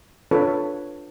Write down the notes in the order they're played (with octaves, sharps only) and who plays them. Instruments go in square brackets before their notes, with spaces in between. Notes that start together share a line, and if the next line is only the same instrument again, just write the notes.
[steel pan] D4 F4 A4 B4 C#5